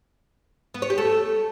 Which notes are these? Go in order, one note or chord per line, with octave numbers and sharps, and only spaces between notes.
B3
C#5
G4
A3